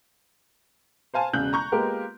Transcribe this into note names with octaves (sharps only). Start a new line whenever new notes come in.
C5 F5 G#5 A5
E1 C#3 C#4 F#6 G6 F#7
A#5 C#6 G6
G#3 A#3 B3 F4 G4 A#4